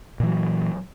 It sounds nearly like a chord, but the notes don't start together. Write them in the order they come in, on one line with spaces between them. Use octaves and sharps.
A#2 E3 F#3